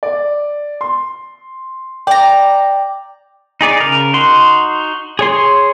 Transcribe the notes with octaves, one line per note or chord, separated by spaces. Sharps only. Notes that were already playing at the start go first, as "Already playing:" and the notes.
D5
C6
D5 G5 A#5
D#4 G#4 D5
C#3 A#4
D#4 F#4 C6
G#4 C#5 C6